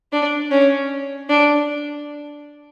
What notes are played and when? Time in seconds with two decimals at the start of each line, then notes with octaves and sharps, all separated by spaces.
0.13 D4
0.51 C#4
1.29 D4